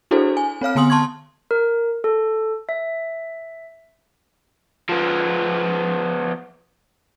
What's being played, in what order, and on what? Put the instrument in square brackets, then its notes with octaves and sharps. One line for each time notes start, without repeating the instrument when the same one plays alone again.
[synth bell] D4 E4 F#4 G#4 A4 C5
G#5
C4 C#5 F5 F6
D3 B3 G#5 C6 D#6 F#7
A5 C6 C#6 G#6
[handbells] A#4
A4
E5
[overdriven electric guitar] F3 B3